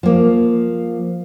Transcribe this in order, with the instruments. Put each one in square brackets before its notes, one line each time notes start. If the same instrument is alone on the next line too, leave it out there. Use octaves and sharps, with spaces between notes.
[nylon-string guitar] F3 A#3